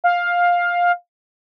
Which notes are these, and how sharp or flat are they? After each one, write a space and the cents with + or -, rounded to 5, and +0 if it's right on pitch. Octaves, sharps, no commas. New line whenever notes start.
F5 +10